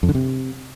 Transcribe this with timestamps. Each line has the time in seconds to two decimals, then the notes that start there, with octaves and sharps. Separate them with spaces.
0.03 F2
0.09 D3
0.15 C3